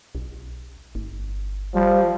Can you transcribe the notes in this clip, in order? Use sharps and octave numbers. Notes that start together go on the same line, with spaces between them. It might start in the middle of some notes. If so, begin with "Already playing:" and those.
B1
G1
F3 G3